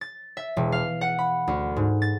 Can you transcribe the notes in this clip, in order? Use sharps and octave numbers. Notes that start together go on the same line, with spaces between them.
A6
E5
E1
F5
F#5
B5
D2
G#2
A6